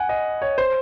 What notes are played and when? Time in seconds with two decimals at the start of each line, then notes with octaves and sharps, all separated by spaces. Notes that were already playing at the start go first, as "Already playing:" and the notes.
Already playing: F#5 G#5
0.09 D#5
0.42 C#5
0.58 C5